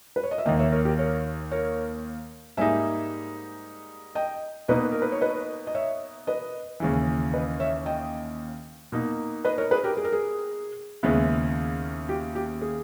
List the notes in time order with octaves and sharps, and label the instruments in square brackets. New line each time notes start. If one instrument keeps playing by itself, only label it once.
[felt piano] B4
C#5
D#5
E5
[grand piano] D#2 D#3 A#3 [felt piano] D#5 G5
[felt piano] C#5 E5
A#4 C#5
G4 A#4
A#4 C#5
A#4 C#5
[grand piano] G#2 G3 A#3 D#4 [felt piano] E5 G#5
[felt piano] D#5 G5
[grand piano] B2 A#3 D#4 [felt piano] B4 D#5
[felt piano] A#4
B4
C#5
B4 D#5
D#5
C#5 E5
B4 D#5
[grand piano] D#2 C#3 E3
[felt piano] B4 D#5
C#5 E5
D#5 G5
[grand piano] B2 A#3 D#4
[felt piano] B4 D#5
A#4 C#5
G#4 B4
G4 A#4
G#4
A#4
G#4
[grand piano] D#2 C#3 G#3 B3 E4
[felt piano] G4
G4
G#4